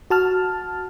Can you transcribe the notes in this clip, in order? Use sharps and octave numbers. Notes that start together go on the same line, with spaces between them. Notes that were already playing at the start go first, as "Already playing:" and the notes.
F#4 A5 F6